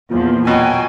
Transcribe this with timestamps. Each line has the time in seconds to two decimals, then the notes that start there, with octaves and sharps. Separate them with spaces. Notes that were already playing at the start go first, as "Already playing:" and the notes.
0.11 E2 A#2 F3
0.47 B2 F#3 G5 G#5